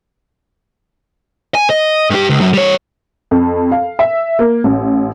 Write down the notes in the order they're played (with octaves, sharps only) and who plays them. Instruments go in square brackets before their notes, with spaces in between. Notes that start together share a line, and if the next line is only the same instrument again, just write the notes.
[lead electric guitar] G#5
D#5
G2 G4
C#2
F#2
G3 C#5
[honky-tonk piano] F2
F5
E5
A#3
A1